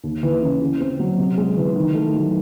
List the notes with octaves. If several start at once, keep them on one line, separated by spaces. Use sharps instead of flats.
D#2
E3
C#3
C#3
C4
F#3
C3
G#3
E3
D#3
A3
F#3